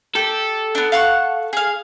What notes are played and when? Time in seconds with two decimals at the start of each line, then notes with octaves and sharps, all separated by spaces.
0.15 G4 A4
0.75 B3 D4
0.92 F5 F#5 C#6
1.53 G#4 F5